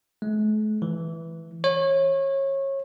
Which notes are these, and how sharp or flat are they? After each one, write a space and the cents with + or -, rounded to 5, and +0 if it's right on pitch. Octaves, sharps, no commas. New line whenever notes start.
A3 -45
E3 +0
C#5 -25